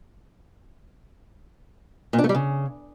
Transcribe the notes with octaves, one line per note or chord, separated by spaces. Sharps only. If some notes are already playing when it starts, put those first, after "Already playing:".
A#2
D4
A3
G3
C#3